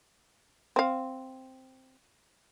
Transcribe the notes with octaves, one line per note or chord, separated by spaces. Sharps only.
C4 F5